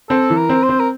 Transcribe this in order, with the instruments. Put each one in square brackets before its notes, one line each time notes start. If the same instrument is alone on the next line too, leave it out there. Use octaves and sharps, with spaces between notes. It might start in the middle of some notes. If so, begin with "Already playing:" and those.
[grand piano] C4 [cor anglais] A4
[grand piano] E3
[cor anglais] A#4
[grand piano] C4
[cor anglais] C5
[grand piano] C4
[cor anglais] A#4